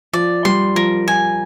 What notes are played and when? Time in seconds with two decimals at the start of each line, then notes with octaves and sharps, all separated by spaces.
0.13 F3 D5
0.45 G3 C6
0.75 F3 A#4
1.07 F3 G#5